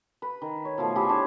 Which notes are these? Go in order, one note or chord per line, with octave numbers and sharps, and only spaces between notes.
B4
D#3
C#5
B2 F3 A3
E4 G4 G#4 C5
D4 C5 C#5